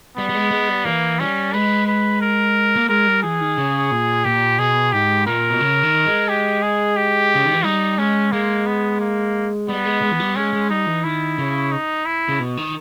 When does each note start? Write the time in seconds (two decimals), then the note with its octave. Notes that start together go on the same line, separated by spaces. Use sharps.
0.17 G3 B3
0.29 G3
0.35 G#3
0.51 G#3
0.69 G3
0.85 E3 A#3
1.20 G3 C#4
1.53 G#3 B4
1.87 B4
2.21 A#4
2.76 A#3
2.89 G#3 A#4
3.07 G3
3.23 E3 G#4
3.40 D#3
3.58 C#3
3.91 A#2
4.25 A#2 G4
4.58 B2 G#4
4.93 G#2 G4
5.27 A#2 A#4
5.50 B2
5.60 C#3
5.83 D#3
6.06 G#3
6.29 G4
6.63 G#4
6.97 G4
7.35 C#3
7.45 D#3
7.54 E3
7.64 G3 D#4
7.98 G#3 C#4
8.32 G#3 A#3
8.67 B3
9.00 A#3
9.69 G3 B3
9.85 G#3
10.02 G#3
10.12 E3
10.20 G3
10.36 G#3 C#4
10.53 G#3
10.70 G3 D#4
10.86 E3
11.04 D#3 E4
11.38 C#3
11.72 D#4
12.06 E4
12.29 C#3
12.40 B2
12.57 D#3